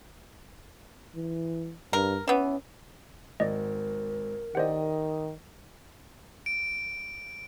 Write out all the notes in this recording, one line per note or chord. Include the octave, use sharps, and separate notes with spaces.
E3
G2 A#4
E3 B3 C#4
G#1 A#4 D5 D#5
D#3 G4 C5 D5 D#5 F#5
D7